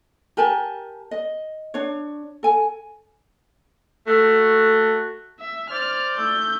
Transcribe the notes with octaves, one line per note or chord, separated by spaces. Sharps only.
G4 A#4 G#5 A5
D#5
D4 C#5
A4 G#5
A3 F#4 A4
E5
C5 D5 F6
A3 G6